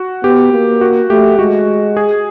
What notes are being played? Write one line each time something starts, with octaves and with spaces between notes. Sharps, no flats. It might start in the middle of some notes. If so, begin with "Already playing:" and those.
Already playing: F#4
B3 G4
A#3
F#4
A3 G4
G#3 F#4
G#4